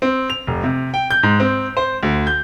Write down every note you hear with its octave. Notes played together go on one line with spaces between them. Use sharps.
C4
F7
F1
C3
G5
G6
G#2
C4
C5
D2
G6